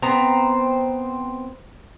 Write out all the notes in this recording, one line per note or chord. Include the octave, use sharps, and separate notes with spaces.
B3 C4 A#5